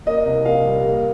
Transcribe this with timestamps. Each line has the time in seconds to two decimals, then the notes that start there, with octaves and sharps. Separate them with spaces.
0.06 A#3 D#5
0.25 C2
0.45 A#2 F5
0.65 G3
0.85 A#3